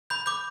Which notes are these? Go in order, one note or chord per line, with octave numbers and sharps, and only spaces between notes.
B5 G6
D6 G6